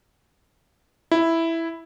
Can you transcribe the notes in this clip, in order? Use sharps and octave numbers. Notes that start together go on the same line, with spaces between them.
E4